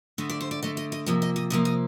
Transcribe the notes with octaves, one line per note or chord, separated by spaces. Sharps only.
D3 A3 D#5
D5
C5
D5
D3 A3 D#5
D#5
D#5
C3 F3 A#3 D#5
D#5
D#5
C3 F3 A#3 D#5
D#5